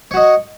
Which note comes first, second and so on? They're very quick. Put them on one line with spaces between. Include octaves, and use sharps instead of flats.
C#5 F#4 D#5